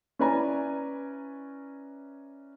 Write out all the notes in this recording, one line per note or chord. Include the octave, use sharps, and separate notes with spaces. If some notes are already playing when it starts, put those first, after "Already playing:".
C#4 E4 B4 D5 G#5 A#5